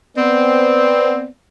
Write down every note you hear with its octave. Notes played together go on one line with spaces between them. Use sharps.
B3 C4 D5